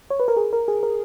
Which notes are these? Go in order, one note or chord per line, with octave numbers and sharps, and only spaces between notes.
C#5
B4
A#4
G#4
A#4
G#4
A#4